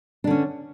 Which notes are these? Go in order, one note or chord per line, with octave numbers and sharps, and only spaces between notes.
D3 C#4 D4